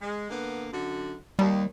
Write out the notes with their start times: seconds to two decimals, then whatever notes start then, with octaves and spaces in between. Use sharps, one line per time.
0.01 G#3
0.30 D3 A#3 B3
0.72 F#2 D3 F#4
1.39 D#2 G3